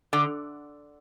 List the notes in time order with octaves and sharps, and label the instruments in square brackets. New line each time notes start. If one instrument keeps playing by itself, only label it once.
[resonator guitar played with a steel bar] D3